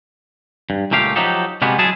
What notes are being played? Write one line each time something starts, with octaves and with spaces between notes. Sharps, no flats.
G2
C#2 A#2 A3 G4 F5
F3 F#3 D#4 G4 A4
C3 G3 G#3 A#3 B3 F#4
F#3 G#3 E4 G#4 A5